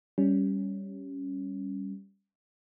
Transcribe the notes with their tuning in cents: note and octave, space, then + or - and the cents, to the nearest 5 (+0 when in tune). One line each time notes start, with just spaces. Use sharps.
G3 +0 C#4 +0